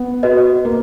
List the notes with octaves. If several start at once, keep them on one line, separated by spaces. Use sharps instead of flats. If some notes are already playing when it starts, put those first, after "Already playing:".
Already playing: B3
F#4 B4 D#5
A#3